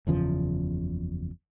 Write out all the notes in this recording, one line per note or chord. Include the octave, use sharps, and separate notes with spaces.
F#1 E2 C#3 F3